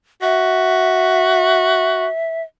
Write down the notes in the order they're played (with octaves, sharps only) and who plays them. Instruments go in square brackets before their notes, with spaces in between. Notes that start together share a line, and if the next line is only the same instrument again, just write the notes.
[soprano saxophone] F#4 [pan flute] E5